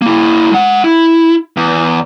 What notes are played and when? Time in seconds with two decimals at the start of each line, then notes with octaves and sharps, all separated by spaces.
0.02 A#3 E4
0.51 G#3 F#5
0.84 E4
1.57 E2